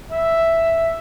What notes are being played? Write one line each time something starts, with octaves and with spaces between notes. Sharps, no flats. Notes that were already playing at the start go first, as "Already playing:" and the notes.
E5